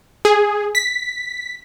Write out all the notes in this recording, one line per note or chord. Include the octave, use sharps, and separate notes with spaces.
G#4
B6